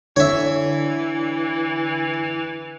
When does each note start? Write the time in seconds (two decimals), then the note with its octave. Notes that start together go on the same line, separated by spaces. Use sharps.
0.16 D3 E3 C#5 E5